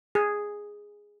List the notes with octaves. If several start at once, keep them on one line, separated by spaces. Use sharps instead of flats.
G#4